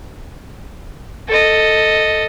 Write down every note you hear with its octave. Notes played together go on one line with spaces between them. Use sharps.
A4 D#5